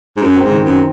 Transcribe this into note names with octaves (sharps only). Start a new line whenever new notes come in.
G#2
F#2
C4
G#2
D#3
F#2